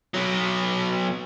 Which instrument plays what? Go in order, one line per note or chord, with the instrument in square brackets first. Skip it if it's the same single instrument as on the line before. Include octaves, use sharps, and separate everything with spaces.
[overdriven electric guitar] B2 F#3